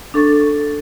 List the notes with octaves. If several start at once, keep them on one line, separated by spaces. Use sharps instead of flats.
D4 A4 C#6 A6